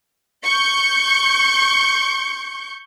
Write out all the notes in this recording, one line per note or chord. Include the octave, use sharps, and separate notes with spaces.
C#6 G6